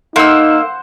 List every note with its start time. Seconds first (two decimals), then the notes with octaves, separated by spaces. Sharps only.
0.16 A#3 D#4 C5 F#5 E6